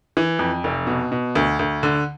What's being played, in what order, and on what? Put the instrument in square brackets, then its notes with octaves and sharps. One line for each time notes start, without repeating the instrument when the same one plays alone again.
[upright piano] E3
F2
F1
B2
B2
D2
D2
D3